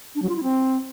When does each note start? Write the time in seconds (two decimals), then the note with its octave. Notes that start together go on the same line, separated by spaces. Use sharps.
0.15 D4
0.22 F#3
0.29 F4
0.36 E4
0.43 C4